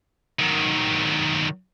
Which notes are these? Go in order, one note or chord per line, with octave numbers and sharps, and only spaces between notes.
D#3 F#3